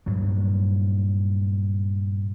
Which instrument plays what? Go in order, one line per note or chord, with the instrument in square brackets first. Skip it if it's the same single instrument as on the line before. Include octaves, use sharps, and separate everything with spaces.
[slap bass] G2 A#2 F#3